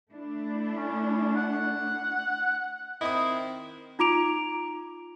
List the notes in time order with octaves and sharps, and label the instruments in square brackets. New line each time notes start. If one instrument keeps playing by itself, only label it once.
[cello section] A3 D4 E4
[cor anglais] C#4
F#5
[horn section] D#3 C4 [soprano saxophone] E4 [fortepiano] D#5 D#6
[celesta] D#4 F4 A#5 D6 D7 F7